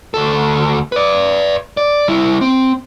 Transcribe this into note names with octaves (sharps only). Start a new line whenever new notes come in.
D2 A4
B4 D5
D5
G3 E4
C4